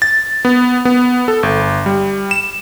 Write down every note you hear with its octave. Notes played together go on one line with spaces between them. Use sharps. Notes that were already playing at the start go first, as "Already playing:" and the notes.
A6
B3
B3
A4
G1
G3
E7